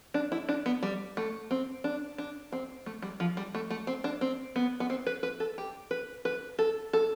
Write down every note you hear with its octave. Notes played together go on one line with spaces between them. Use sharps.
D4
E4
D4
B3
G3
A3
C4
D4
D4
C4
A3
G3
F3
G3
A3
A3
C4
D4
C4
B3
B3
C4
B4
B4
A4
G4
B4
B4
A4
A4